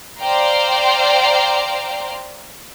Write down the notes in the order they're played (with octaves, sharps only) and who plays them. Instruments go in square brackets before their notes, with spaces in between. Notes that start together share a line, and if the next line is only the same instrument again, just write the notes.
[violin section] C5 D5 F5 G5 A#5 C6